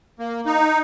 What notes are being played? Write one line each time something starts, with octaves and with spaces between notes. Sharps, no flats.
A#3
D#4